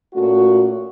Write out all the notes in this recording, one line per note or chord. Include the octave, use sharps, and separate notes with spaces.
A#2 A3 C#4 F#4